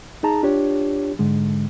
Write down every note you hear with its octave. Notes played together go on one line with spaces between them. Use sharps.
D#4 G#4 A5 A#5
D4 F4 G4 C#5
G#2 D3 G#3